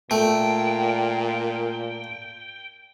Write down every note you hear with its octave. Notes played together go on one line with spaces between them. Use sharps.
A#2 A3 G5